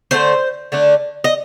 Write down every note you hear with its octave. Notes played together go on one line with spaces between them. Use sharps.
D3 A3 D4 C5
D3 A3 D4
D#5